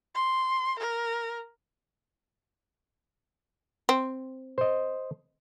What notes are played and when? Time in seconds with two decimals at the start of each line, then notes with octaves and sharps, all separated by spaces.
0.15 C6
0.79 A#4
3.89 C4
4.58 C5 D#5